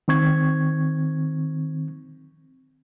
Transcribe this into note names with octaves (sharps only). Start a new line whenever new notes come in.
D#3 C4 C#6 G#6